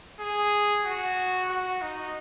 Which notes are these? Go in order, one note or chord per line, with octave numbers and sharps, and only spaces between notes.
G#4
F#4
F#4
D#4